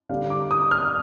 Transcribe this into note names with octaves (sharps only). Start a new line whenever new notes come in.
D3 G3 D4 F5
D6
D#6
F6